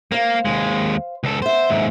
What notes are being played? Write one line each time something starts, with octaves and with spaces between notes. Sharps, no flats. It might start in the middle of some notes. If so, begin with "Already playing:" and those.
A#3 C5 F5
D#2 G#3
C#2 A4
B3 C5 E5
D#2 G#2